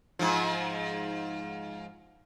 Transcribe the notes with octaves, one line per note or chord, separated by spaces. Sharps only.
G#2 F3